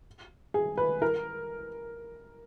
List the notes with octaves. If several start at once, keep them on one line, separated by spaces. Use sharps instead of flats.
G#4
B4
A#4